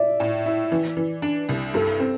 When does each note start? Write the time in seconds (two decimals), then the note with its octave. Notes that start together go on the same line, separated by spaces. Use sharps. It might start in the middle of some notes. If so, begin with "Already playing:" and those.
Already playing: D5 E5
0.20 A2
0.46 E4
0.72 E3
0.97 E3
1.22 D4
1.49 C2
1.74 G2 A4
2.00 C4